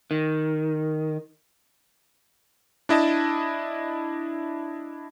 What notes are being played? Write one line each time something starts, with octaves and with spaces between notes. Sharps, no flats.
D#3
D4 E4 D#5 A5